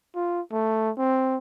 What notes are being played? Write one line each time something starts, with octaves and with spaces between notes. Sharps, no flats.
F4
A3
C4